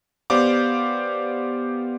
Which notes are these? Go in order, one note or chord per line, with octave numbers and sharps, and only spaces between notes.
B3 G4 C5 D5 F5 D6